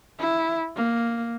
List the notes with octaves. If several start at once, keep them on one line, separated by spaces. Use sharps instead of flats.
E4
A#3